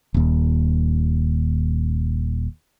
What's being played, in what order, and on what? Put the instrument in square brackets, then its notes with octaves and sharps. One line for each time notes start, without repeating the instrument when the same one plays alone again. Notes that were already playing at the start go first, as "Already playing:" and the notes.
[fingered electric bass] D#1 D#2